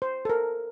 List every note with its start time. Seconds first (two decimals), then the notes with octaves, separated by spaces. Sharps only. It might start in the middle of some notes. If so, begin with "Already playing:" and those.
0.02 C5
0.25 A4
0.30 A#4